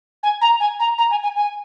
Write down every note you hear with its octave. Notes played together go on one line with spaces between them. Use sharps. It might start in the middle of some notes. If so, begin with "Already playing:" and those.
G#5
A#5
G#5
A#5
A#5
G#5
G#5
G#5